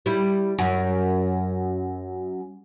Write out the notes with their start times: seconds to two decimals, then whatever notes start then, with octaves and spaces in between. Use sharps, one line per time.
0.06 G3 E4
0.59 F#2